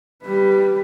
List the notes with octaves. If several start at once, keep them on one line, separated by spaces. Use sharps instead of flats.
G3 B4